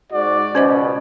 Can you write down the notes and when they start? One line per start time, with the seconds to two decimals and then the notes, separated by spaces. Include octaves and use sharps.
0.12 G#2 F#4 D5
0.55 C#2 B2 C#4 C5 D#5